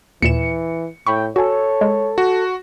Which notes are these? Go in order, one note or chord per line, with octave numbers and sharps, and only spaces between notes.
D#2 A#2 E3 C#7 E7
A2 G5 B5 C#6
F#4 A4 C#5 G#5
G#3
F#4